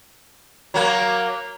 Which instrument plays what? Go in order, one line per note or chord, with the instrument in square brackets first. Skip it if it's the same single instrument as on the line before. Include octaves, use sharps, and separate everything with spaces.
[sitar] F#3 A#3